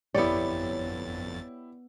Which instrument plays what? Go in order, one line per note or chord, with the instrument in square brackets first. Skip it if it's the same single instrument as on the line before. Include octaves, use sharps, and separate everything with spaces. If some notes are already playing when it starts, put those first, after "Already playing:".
[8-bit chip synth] G1 F2 A6 [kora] B3 D5 [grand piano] E4 G4 [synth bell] C#5